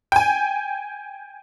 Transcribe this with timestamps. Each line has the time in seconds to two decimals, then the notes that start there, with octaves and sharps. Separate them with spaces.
0.12 G5 G#5